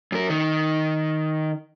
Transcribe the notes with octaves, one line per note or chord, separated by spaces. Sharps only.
F#2 A#4
D#3